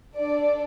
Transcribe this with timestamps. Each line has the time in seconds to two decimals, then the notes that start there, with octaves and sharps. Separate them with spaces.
0.16 D4 A4 D5